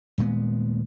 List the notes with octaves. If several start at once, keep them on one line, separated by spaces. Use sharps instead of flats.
D#1 A#2 G#3 B3